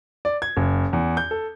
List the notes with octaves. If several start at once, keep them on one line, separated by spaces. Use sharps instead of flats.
D5
G#6
F#1
E2
G6
A4